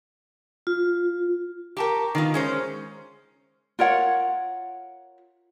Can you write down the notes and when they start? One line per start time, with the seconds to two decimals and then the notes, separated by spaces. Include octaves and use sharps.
0.67 F4
1.77 G4 A#4 G5 A5 C#6
2.15 D#3 B3 F4
2.34 G#3 C#4 C5
3.79 F4 A#4 C#5 F#5